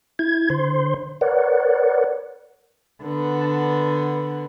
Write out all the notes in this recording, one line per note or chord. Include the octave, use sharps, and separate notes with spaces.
E4 G#6
D3 C5 C6
A#4 B4 C#5 D5 F#5
D3 B3